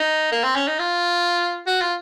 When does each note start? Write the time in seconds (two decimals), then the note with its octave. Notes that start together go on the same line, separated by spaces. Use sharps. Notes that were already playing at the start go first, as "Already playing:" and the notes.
Already playing: D#4
0.32 A#3
0.44 C4
0.56 C#4
0.67 D#4
0.79 F4
1.67 F#4
1.81 F4